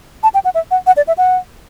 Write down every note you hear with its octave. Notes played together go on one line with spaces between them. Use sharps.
A5
G5
F#5
E5
F#5
F#5
D5
E5
F#5